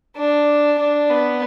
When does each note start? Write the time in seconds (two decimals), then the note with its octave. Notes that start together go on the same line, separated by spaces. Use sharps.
0.16 D4
0.78 D4
1.10 B3